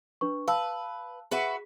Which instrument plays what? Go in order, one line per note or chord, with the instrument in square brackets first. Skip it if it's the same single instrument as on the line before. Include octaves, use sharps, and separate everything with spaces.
[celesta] D4 B4 C#6
[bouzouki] B4 [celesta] F5 A5 E6
[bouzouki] F#4 B4 E5 [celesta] G#4